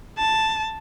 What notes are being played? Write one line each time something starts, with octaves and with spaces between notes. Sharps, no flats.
A5